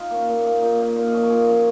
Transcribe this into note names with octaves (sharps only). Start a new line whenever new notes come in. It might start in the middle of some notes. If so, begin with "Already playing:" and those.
Already playing: D#4 F4
A#3 C#4
A#2
A#3 D#4
A#2 D#4
A#3 D#4
A#2 F5
D#5
F3 C#4 C#5
A#4
A#2 G#4
F3 C#4